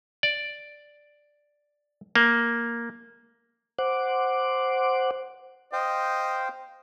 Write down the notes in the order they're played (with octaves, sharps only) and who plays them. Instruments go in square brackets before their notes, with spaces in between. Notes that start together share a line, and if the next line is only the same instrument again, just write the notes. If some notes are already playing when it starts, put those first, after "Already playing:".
[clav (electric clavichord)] D5
A#3
[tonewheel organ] C5 F#5 D6
[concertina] C5 F5 G5 [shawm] D#5